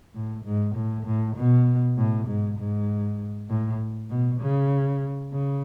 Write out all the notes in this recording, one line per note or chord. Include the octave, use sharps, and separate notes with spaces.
A2
G#2
A2
A2
B2
A2
G#2
G#2
A2
B2
C#3
C#3